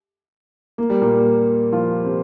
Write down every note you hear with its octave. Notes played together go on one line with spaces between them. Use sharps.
A#3
G3
A#2 A#3
F3 F4
C3 C4